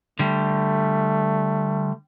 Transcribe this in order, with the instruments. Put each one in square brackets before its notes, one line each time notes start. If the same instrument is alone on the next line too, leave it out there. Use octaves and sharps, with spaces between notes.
[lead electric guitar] D3 G3 [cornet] A3